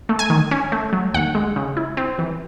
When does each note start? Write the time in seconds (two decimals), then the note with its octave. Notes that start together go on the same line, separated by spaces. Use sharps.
0.09 A3
0.19 G#5
0.30 D#3
0.51 C#4
0.72 A3
0.93 F#3
1.14 D#2 F#5
1.35 G#3
1.56 C#3
1.77 E4
1.97 C4
2.19 E3